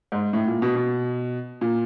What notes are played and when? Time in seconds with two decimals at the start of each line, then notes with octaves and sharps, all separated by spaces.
0.12 G#2
0.33 A2
0.47 A#2
0.62 B2
0.76 B2
1.61 A#2